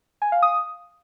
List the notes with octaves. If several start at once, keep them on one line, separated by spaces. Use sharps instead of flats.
G#5
F5
D#6